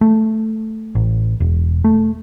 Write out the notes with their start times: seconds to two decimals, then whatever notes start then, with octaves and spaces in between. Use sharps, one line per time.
0.01 A3
0.95 A1
1.40 E1
1.84 A3